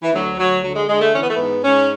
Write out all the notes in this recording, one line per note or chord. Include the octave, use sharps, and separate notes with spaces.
E3
D2 F#3
D2 F#3
D3 F#3
G#3
D3 G#3
A3
E3 C#4
B3
A3
G#2 B3
G#2 C#4